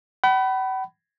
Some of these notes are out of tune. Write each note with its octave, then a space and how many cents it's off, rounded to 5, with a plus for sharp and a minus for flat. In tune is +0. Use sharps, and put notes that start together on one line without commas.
F#5 +45 B5 +0